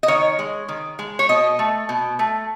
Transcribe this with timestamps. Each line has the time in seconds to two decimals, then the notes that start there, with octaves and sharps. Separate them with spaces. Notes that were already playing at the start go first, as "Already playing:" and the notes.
0.03 D#5
0.08 D#3 C#5
0.39 G#3
0.69 D#3
0.99 G#3
1.19 C#5
1.29 B2 D#5
1.59 A3
1.89 B2
2.19 A3